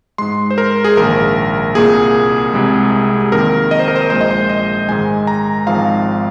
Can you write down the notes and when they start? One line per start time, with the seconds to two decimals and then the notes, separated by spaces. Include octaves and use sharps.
0.18 G#2 G#3 C6
0.51 C5
0.58 A#4
0.84 G#4
0.97 A#1 G#2 D#3 A#3 A#4
1.75 C2 A#2 A#3 G#4
2.53 C2 C3 G#3
3.32 F2 D#3 A#3 A#4
3.71 D#5
3.79 C5
3.88 A#4
3.96 C5
4.10 A#1 A#2 G#3 C5
4.21 D#5
4.31 C5
4.49 D#5
4.88 G#2 D#3 G#3 G#5
5.27 A#5
5.67 G#1 G#2 F3 F5